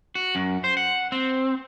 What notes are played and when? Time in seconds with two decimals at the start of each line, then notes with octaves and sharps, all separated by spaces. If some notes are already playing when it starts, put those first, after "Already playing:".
0.15 F#4
0.35 F#2
0.64 C5
0.77 F#5
1.12 C4